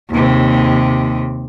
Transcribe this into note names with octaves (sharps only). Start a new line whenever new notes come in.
D#2 C3